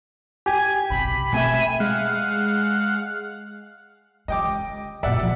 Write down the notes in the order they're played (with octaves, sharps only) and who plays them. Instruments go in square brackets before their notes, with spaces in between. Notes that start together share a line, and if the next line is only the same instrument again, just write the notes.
[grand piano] G4 [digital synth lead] G#5
[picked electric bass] F#1 B1 C3 [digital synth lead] B5
[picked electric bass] B2 A3 C4 [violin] E5 G#5
[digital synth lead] G#3 [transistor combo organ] F5 F#5
[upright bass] C#3 G#3 [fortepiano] D#5 G5 D6
[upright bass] F#2 A#2 [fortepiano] D5 E5 F#5
[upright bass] C#2 F3